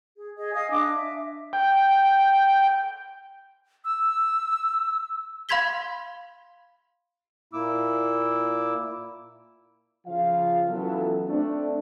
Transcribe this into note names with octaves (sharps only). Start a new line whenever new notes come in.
G#4
G#4 D#5
D#5 F5 G#5 D#6
D4 D#5 D6
E5
G5
E6
F5 B5 C6 G#6 B6 G7
A#2 A#3 E4 D6 E6
C#3 F3 F4 F5
E3 F#3 B3 C#4 F4 A4
A3 C4 D4